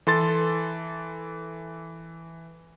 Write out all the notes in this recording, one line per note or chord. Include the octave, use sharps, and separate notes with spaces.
E3 A4 C6 A6